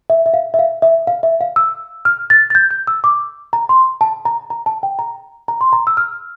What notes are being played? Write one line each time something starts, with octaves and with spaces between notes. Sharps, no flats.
E5
E5
F5
E5
F5
E5
F5
E5
F5
E6
F6
A6
A6
G6
G6
E6
D6
A#5
C6
A5
A#5
A#5
A5
G5
A#5
A#5
C6
A#5
E6
F6